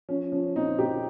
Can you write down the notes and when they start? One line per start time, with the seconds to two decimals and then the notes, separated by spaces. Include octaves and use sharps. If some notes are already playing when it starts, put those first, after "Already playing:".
0.09 F3 C#4
0.32 F3 C#4
0.55 A#2 C4 D#4
0.79 A#2 D#4 G4